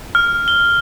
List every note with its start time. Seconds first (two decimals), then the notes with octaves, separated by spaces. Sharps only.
0.15 F6
0.48 G7